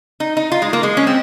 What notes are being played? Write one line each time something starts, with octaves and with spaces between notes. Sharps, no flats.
D#4
D#4
F4
G#3
A#3
G#3
C#4
C4